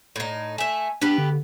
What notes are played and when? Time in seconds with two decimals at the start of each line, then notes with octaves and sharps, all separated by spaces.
0.16 A2 D#4
0.58 A3 E5 G#5
1.02 B3 D4 G4 B4
1.18 D3